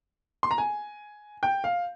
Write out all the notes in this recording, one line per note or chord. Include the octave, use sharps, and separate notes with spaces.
C6
A#5
G#5
G5
F5